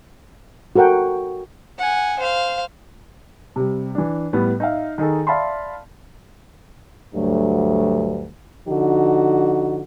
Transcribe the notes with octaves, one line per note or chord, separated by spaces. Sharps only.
F#4 A4 A#4 F#5 G5
F#5 G#5
C5 F5
C3 G3
E3 D4
A2 G3 B3
D#4 E5 F5
D#3 D#4 G#4 A4
D5 E5 F5 A5 B5 C6
D2 G2 F#3 A3
D3 F3 D#4 F#4